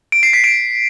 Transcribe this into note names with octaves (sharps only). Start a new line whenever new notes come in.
D7
C7
B6
D7